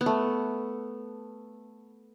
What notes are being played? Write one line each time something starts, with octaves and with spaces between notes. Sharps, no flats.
B3
A3